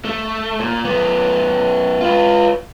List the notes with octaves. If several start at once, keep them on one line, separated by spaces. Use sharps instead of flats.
A3
A#2
F#2 B3
F4 B4